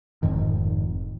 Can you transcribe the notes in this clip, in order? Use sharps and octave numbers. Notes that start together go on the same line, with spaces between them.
F1 F2 G#2 D#3